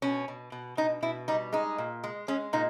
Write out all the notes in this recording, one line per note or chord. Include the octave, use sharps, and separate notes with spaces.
B2 C#4
B2
B2
B2 D#4
B2 E4
G3 D#4
G#3 D#4
A#2
G#3
G#3 C#4
A#2 D#4